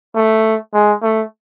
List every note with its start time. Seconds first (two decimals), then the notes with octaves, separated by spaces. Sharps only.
0.15 A3
0.73 G#3
1.02 A3